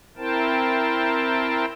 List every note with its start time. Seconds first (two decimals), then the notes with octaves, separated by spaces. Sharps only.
0.17 C4 E4 A#4 C5 G5 A5